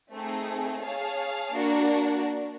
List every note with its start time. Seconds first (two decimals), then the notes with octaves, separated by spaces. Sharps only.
0.11 A3 C4 D#4 G#4
0.81 G#4 C#5 F5 A5
1.52 A#3 D4 F#4